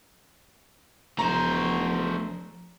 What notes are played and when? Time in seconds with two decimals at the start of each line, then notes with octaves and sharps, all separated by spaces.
1.19 E1 F3 A3 C5 A#5